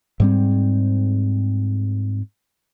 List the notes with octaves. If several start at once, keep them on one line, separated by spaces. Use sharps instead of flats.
G#2 G3 C4